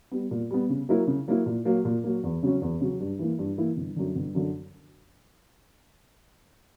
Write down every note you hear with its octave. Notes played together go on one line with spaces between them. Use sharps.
G3 B3
A#2
G3 B3
C#3
F#3 A#3 E4 A#4
C#3
F#3 A#3 E4 A#4
A#2
F#3 A#3
A#2
F#3 A#3
E2
C#3 F#3 C#4
E2
C#3 F#3 C#4
G2
E3 A#3 E4
G2
E3 A#3 E4
G1
F#2 D3
G1
F#2 D3